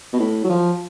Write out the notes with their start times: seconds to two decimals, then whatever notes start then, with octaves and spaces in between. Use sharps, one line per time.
0.13 B2
0.20 A2
0.44 F#3
0.50 F3